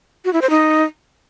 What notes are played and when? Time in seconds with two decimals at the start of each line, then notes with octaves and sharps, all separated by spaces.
0.25 F#4
0.33 E4
0.42 C5
0.50 D#4